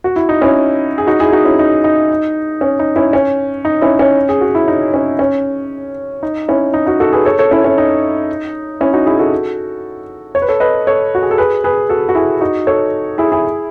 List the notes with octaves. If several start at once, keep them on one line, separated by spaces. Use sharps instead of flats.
F#4
E4
D#4
C#4 E4
G#4
D#4 F#4
E4 G#4
D#4 F#4
C#4 E4
D#4
D#4
C#4
D#4
C#4 E4
C#4
D#4
C#4 E4
C#4
G#4
F#4
E4
D#4
C#4
C#4
D#4
C#4 E4
D#4
D#4 F#4
F#4 A4
G#4 B4
A4 C#5
A4 C#5
C#4 E4
C#4 E4
D#4
C#4 E4
D#4 F#4
E4 G#4
F#4 A4
C#5
B4
A4 C#5
B4 D#5
A4 C#5
F#4
G#4
A4
G#4 B4
G#4 B4
F#4 A4
F#4
E4 G#4
D#4 F#4
A4 C#5
E4 G#4
E4 G#4